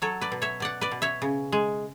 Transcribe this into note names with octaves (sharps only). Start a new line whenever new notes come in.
F#3 A4 C#5
B4 D5
B2
C#5 E5
B2 D5 F#5
B4 D5
B2
C#5 E5
C#3
G#3